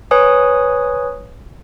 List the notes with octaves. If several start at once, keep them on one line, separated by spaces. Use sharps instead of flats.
B4 C#5 G#5 D#6